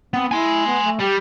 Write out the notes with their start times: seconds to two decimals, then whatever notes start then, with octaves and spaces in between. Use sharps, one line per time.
0.14 B3 C4
0.31 E4 G#5 C6
0.67 B3
0.85 A3
1.00 G3 G4